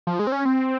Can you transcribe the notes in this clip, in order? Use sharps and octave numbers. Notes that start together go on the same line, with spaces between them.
F3
G#3
C4
C#4
C4